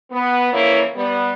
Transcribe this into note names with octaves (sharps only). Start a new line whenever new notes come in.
B3
C#3 E3 F3 A#3 E4 C#5
G3 B3